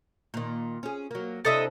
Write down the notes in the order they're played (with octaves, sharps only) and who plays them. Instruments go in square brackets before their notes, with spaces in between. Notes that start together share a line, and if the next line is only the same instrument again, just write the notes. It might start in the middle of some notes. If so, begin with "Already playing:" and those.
[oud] A#2 D#3
C#4 G#4
F#3 A#3
[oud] C3 D4 E4 [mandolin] A4 D#5 E5